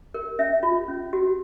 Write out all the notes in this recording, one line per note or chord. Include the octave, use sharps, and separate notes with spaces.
A#4
C#4 E5
F4
C#4
F#4